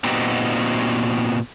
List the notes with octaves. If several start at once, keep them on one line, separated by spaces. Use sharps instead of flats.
A#2 B3 C4 D#4 F#4 G4